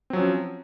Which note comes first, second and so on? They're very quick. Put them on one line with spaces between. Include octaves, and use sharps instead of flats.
C4 F#3 F3 C#4